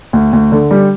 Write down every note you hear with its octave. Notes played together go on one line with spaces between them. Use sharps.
D2
D2
D3
G3